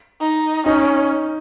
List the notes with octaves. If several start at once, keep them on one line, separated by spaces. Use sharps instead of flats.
D#4
C#4 D#4